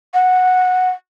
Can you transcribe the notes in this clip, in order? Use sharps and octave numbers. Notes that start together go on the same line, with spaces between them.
F#5